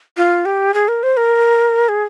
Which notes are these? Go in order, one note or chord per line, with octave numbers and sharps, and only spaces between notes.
F4
G4
G#4
A#4
C5
A#4
G#4